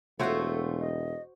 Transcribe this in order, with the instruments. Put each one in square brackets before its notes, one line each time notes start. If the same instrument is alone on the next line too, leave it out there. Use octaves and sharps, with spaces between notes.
[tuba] E1 [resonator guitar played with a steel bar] A3 F4 [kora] F#4 C5 C#5 [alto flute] A4
[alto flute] D#5